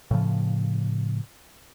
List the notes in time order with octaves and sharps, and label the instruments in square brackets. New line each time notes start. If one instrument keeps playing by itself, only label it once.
[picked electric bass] A2 C#3 F3